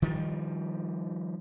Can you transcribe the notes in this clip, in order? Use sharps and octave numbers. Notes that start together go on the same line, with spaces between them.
D#3 F3 G3